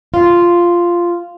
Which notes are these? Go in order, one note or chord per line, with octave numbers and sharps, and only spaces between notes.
F4